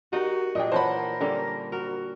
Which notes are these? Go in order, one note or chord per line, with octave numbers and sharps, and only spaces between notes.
D#4 F#4 G4 A#4 D#5
A#2 D4 G#4 D#5 G5
E3 A#4 C5 C#5 F#5 A5 B5
D3 G3 A#3 C#4 A4
F#4 A#4